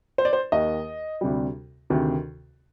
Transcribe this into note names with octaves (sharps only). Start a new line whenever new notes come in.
C5
D5
C5
D#2 D#3 A#3 D#5
D2 C3 G3
D2 C3 D#3